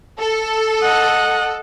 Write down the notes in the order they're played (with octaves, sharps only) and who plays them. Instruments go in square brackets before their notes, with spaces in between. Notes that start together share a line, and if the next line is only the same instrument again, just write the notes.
[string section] A4
[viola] D#5 F#5